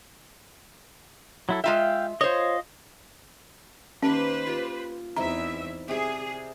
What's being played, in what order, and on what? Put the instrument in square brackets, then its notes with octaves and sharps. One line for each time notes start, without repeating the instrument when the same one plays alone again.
[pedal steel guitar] F#3 E4 A4
[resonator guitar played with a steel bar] G#3 F4 E5 [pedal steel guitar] F5 G5
[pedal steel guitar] F4 D#5 [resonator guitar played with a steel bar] C5 C#5
[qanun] D#3 A#3 G4 [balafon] C#4 [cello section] B4 C5
[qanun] F4 G4
[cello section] E2 E5 [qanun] C4 D#4 E4 [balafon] A#5
[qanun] C3 D5 [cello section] G#4